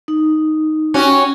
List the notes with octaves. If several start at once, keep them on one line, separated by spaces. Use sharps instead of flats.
D#4
C#4 F#4 G4